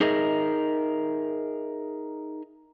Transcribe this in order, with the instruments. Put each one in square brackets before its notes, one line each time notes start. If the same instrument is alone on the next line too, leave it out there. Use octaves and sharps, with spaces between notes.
[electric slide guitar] D#4 G#4 A#4 D#5 E5